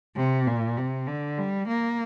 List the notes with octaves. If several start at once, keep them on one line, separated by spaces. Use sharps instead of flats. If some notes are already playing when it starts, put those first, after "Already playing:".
C3
A#2
C3
D3
G3
A#3